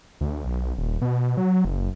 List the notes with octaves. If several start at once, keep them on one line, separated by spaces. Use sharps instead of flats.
D2
B1
D#1
B2
F#3
F#1